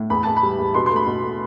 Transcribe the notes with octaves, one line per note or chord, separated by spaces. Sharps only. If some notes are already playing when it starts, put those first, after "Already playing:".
Already playing: A2
E2 B5
E2 A5
B5
G3
E2
B2 C6
C6
A3
B5
B2
A3